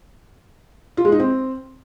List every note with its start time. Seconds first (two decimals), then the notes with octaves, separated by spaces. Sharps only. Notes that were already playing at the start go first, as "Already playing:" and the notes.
0.97 F4
1.05 G#3
1.12 D#4
1.20 C4